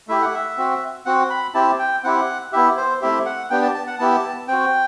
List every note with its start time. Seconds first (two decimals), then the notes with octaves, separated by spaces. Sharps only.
0.08 A3 E4 G4 E5
0.22 F#5
0.34 E5
0.58 C4 F#4
1.06 C4 F#4 F#5
1.30 B5
1.54 C4 E4 G4 A5
1.79 G5
2.03 C4 E4 G4 F#5
2.52 B3 E4 G4 E5
2.77 C5
3.01 A3 C4 E4 G4 E5
3.26 F#5
3.50 B3 D4 G4 G5
3.62 A5
3.75 A5
3.87 F#5
3.99 B3 E4 G4 A5
4.48 C4 F#4 G5